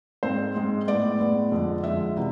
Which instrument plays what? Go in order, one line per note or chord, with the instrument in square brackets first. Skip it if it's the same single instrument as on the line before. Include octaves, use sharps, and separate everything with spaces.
[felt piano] G#2 G#3 C4 C5
G#2 G#3 C4
A2 G#3 B3 D5
A2 G#3 B3
F2 D3 G#3
F2 D3 G#3 E5
C3 E3 B3